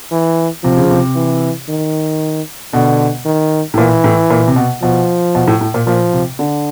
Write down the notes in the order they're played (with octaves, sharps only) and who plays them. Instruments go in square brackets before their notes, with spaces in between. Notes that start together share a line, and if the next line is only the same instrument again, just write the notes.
[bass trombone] E3
[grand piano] C3 [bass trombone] F3
[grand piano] C#3
C3
[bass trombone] E3
D#3
[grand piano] B2 [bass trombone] D3
[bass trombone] D#3
[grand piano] A2
[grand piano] A#2 [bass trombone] E3
[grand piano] A2
A#2
C3
B2
[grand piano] B2 [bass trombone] F3
[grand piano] B2
A2
A2
A#2
[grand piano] A#2 [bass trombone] F3
[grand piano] C3
D3